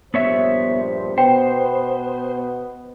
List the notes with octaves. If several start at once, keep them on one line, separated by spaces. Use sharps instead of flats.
A#1 G2 B3 C5 C#5 E5
B2 B3 C5 G5